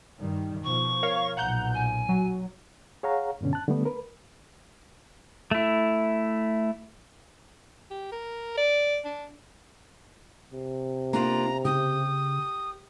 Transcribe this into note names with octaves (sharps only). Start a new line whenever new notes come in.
G2 D#3 G3
B2 F3 C#6
A#4 C#5 F5
B1 A#2 F#5 A#5 G6
G#5
F#3
G#4 C#5 F5 F#5 A#5
G2 B2 D3 C#4
A5 F#6
D3 G3 A3 B3
A#4 B4
A3 E4
G4
A#4
D5
D4
C3
A#3 D4 F4 A#5
C#3 G4 D#6